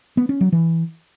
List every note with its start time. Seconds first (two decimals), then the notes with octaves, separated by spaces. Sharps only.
0.17 B3
0.29 C#4
0.41 F#3
0.52 E3